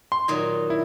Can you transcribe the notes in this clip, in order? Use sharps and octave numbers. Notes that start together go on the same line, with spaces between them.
C6
A#2 D#3 F#3
E4